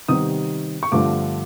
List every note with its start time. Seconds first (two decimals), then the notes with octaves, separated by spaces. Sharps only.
0.08 C3 D#3 G3 B3 D#6
0.83 C#6
0.92 G2 D3 F3 A3 C4 D6